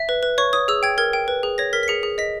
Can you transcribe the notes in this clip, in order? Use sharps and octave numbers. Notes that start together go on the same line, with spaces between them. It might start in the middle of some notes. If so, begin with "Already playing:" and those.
Already playing: E5
B4
B4
C#5 C#6
C#5 D#6
G#4 E6
G5 G#6
A#4 G#6
G5
B4
G#4
C#5 A#6
A#4 B6
B6
G#4 C#7
G#4
D#5 B6